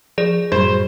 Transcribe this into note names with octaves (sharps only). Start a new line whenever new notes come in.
F3 G#4 D5
F#2 A2 F#3 G3 C5